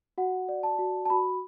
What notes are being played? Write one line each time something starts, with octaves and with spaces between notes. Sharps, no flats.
F#4 F#5
D5
A5
F#4
A5
F#4 B5